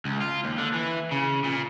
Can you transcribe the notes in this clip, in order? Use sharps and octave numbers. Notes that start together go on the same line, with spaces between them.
C#2
F4
D#2
D3
E3
C#3
A#2